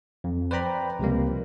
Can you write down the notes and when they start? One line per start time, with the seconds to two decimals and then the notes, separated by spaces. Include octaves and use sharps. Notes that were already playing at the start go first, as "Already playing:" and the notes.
0.24 F2
0.51 B4 C5 D5 G5 A#5 B5
0.99 C#2 C3 F3 G3 A#3